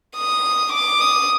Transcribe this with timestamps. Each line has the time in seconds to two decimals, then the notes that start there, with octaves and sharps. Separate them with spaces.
0.17 D#6
0.73 D6
1.01 D#6